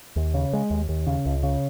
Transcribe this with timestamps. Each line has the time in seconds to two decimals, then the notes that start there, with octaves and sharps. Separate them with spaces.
0.16 D#2
0.34 C#3
0.53 G#3
0.70 D#2
0.89 D#2
1.07 C#3
1.26 C#2
1.43 C#3